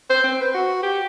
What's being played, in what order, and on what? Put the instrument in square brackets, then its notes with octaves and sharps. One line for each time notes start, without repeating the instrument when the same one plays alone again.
[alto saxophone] C5
C4
B4
F#4
G4